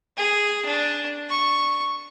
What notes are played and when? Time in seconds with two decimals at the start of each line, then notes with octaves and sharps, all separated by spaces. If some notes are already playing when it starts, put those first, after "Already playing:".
0.17 G#4
0.65 D4
1.30 C#6